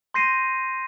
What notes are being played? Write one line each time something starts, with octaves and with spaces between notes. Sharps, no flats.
C6 G6 A#6 C7 D#7